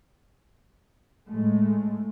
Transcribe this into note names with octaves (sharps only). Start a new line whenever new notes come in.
A2 G#3 A3